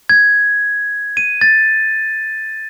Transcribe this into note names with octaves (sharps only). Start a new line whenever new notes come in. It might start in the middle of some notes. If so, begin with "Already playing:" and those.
G#6
D#7
A6